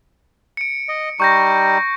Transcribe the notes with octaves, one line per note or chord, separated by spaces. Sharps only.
C#7 D7
D#5
G3 D#4 C#6 G6 A#6